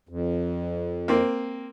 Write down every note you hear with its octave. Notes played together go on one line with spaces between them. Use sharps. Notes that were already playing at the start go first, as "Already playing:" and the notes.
F2
A#3 C4